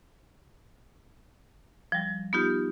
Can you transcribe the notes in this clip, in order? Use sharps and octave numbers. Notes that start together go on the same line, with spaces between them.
F3 G3
B3 D#4 F4 G4